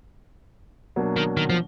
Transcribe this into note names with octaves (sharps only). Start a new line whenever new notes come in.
B2 F#3 A#3 D4
D#3
D#3
F3